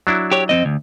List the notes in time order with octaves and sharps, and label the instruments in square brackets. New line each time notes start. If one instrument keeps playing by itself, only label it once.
[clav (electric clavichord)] F#3 D4 E4
[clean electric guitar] G4 C#5
F2 C4 D#5
D2